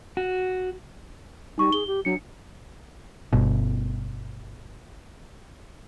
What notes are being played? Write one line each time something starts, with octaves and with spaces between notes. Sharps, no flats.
F#4
G3 D#4 C#6
G#4 G7
G4
F#3 D4 C#7
G1 B2